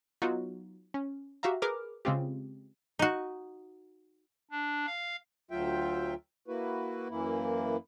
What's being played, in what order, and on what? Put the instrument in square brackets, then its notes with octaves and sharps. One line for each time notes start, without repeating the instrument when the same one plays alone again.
[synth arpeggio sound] F#3 B3 D#4 F4 F#4
C#4
F#4 G4 E5 F5 A#5
G#4 A#4 B4 D6 F6
C#3 G#3 C4 F4 G4
[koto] D#4 F#4
[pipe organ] D4
F5
[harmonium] D2 F#3 F4 E5 G5
A#3 E4 F#4 B4
F#2 E3 A#3 E4